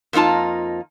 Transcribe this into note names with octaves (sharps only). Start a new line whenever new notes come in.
F2 A#3 D#4 F4 A5